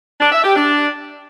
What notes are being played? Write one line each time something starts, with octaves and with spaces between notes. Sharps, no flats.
D4
E5
G4
D4